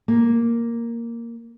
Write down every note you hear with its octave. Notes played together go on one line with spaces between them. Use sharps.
A#3